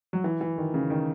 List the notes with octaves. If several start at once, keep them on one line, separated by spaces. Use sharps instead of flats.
F#3
E3
E3
D#3
C#3
D#3